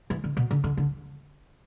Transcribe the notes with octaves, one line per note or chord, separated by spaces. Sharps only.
E3
D3
B2
D3
D3
D3